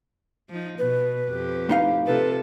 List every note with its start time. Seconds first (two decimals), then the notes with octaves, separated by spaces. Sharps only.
0.49 F3 D#4
0.79 B2 B4
1.30 F2 G4
1.69 A2 D#4 F5
2.07 C3 F4 A4 B4